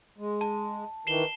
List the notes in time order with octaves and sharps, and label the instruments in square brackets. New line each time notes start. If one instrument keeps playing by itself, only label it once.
[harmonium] G#3
[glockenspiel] A5
[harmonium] D#3 E3 [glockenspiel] C7 E7 G7